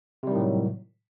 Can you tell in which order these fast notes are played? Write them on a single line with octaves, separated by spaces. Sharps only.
C3 G3 D#3 A2 F#3